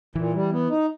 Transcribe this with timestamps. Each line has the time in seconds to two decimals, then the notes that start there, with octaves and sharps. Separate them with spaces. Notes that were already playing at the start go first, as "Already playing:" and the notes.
0.15 A#2 E3
0.34 G3
0.52 B3
0.69 D#4